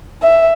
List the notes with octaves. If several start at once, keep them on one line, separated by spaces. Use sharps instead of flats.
E5